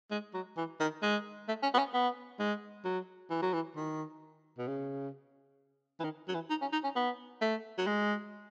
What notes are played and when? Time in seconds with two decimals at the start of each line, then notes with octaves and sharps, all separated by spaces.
0.11 G#3
0.34 F#3
0.57 E3
0.80 D#3
1.02 G#3
1.48 A3
1.63 C#4
1.74 B3
1.78 C#4
1.94 B3
2.39 G#3
2.85 F#3
3.30 E3
3.42 F#3
3.53 E3
3.76 D#3
4.58 B2
4.68 C#3
6.00 E3
6.04 D#3
6.28 F#3
6.34 E3
6.50 D#4
6.61 C#4
6.72 D#4
6.84 C#4
6.96 B3
7.41 A3
7.78 F#3
7.87 G#3